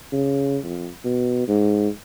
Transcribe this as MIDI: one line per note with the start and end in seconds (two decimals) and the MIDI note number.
0.13 0.58 49
0.64 0.89 41
1.04 1.45 47
1.48 1.89 44